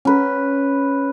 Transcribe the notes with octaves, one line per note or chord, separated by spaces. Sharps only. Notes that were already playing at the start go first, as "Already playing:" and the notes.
C#4 B4